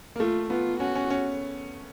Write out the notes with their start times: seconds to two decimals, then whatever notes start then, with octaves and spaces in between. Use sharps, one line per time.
0.16 A#3
0.19 A3 F4
0.50 B3 F4
0.80 C#4 F#4
0.95 C#4
1.10 C#4